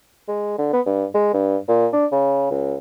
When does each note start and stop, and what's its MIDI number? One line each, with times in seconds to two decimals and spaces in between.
0.28 0.54 56
0.58 0.72 50
0.73 0.81 59
0.86 1.05 43
1.14 1.29 56
1.33 1.57 43
1.68 1.88 46
1.93 2.06 62
2.12 2.48 49
2.50 2.76 37